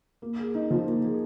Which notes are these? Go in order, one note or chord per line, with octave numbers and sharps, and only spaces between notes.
A#3
G#4
D#4
F3
A#3
G#4